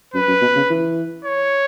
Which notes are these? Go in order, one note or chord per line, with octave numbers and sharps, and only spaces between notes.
F#2 B4
F#2
B2
C#3
E3
C#5